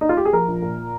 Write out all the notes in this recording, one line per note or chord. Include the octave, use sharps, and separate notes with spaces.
D#4
F4
G4
G#4
F3 A#4
A#1
A#2